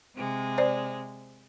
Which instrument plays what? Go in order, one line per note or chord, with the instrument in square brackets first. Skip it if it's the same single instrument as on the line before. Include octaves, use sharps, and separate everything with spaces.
[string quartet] C3 G#3
[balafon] C5 D5